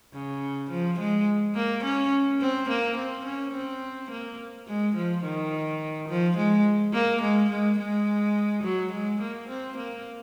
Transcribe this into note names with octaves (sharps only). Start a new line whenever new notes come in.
C#3
F3
G#3
A#3
C#4
C4
A#3
C4
C#4
C4
A#3
G#3
F3
D#3
F3
G#3
A#3
G#3
G#3
G#3
F#3
G#3
A#3
C4
A#3